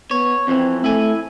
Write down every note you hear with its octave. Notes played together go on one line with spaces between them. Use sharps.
B3 C#5
F2 E3 C4
A3 E4 G#5